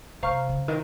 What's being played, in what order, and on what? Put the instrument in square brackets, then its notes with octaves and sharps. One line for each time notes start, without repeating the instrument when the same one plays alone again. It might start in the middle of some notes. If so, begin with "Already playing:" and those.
[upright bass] C3 [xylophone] C5 F5 A#5 C#6 F6
[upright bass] C#3
D#3